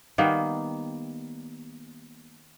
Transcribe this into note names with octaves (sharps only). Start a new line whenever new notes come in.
D#3 G3 A#3 B3